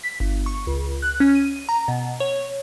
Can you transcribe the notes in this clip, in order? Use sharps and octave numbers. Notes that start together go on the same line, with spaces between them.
B6
G1
C#6
C#2
F#6
C#4
D#7
A#5
B2
C#5